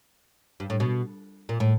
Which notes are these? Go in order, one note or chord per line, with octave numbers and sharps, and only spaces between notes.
G2
A2
B2
A#2
A2